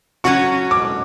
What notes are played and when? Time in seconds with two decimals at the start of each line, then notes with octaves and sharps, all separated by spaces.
0.24 F#3 C#4 F#4 C#6
0.71 D6